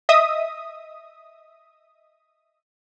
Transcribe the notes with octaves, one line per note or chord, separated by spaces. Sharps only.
D#5 E5 D#6